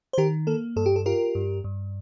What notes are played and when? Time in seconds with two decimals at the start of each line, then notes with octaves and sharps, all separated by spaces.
0.13 C5
0.18 D#3 G4 A#4
0.47 A#3 A4
0.76 G2 A4
0.86 G4
0.96 A4
1.06 F4 G4 A#4
1.35 G2
1.64 G2